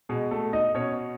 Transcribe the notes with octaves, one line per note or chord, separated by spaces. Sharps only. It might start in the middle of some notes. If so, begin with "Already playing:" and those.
B2 G#3 G#4
A3 A4
D#4 D#5
B2 C#4 C#5